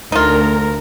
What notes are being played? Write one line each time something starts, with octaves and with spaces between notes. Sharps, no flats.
D2 D#4 F4 A#4